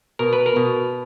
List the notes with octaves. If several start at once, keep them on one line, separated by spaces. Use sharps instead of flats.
B2 A#4
B4
A#4
B2